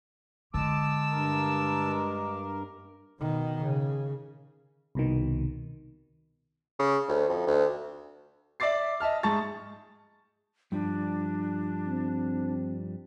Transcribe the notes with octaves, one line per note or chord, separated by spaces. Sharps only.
D3 G#3 A5 D6 E6
G2 A#4
B2 D#3
C#3
C2 B2 D#3
C#3
D2
F2
D2
D5 E5 D6 A6 C7
D#5 E5 A5 F6
G#2 G#4 A5 C#6 A6
G2 F3 G3 D4
C4